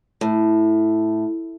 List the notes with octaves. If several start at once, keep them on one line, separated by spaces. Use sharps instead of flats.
A2